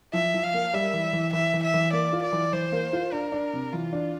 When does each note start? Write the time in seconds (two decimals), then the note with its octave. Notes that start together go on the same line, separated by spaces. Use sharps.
0.13 F3 E5
0.34 F3
0.44 F5
0.54 A#3
0.74 G3 E5
0.94 E3
1.13 E3
1.33 E3 E5
1.54 E3
1.64 E5
1.74 E3
1.93 A#3 D5
2.13 F4
2.23 D5
2.33 E3
2.53 E3 C5
2.72 A#3
2.93 F4
3.12 D4 A#4
3.32 D4
3.53 C3
3.72 E3 F4
3.93 D4